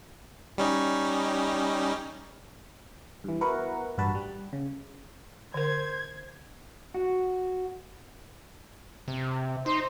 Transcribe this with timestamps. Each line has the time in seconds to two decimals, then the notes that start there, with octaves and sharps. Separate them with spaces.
0.58 G3 C#4 D#4
3.24 G2 E3
3.41 B3 E4 F#4 A#4 B4 F#5
3.98 A1 G2 F#4 B4 A5
4.15 G3
4.53 C#3
5.54 D3 A#4 C5 G#6
6.94 F#4
9.08 C3
9.66 D#4 C5